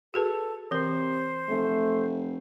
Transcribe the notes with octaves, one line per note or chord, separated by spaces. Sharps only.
F#4 G#4 A4 B4
C3 E3 A#4 C5
F1 A3